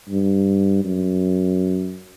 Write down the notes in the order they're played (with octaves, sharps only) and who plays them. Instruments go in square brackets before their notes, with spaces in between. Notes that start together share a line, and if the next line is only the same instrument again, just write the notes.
[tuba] G2
F#2